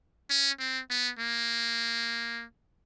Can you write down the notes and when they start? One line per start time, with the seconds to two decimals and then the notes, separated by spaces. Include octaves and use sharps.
0.30 C#4
0.59 C4
0.90 B3
1.19 A#3